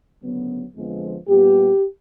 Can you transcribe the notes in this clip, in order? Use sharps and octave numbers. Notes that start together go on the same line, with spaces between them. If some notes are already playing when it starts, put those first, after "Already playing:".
D2 C#3 F#3 B3
F2 D3 F3 G#3 B3
A#2 G3 B3 G4